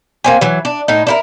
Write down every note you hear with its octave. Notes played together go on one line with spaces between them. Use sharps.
A#3 C4 G#5
E3 F#3
D4
A2 D#4
D4 E4 A#4